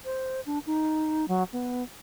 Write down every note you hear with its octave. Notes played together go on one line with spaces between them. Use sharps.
C5
D4
D#4
F#3
B3